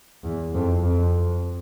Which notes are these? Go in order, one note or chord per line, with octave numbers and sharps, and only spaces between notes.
E2
F2
F2